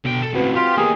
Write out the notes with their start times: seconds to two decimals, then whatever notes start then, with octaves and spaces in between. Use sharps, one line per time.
0.05 B2 D3 G5
0.23 A4
0.34 C#2 A2 C4 F#4 B4
0.56 F4 G4
0.78 A#3 B3 D#4 G4 G#4 A#4